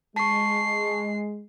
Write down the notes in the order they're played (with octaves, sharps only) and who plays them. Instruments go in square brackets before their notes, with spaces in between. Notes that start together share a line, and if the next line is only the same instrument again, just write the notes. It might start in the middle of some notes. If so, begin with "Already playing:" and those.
[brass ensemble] G#3 [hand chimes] A5 C#6 [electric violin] C7